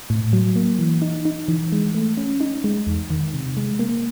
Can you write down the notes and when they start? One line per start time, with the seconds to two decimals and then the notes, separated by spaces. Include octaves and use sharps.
0.10 A2
0.33 F#3
0.56 A#3
0.79 E3
1.02 D#4
1.25 D#4
1.48 E3
1.72 G#3
1.95 A3
2.17 C#4
2.40 D#4
2.64 G#3
2.87 E2
3.10 D#3
3.34 C3
3.57 G#3
3.79 A#3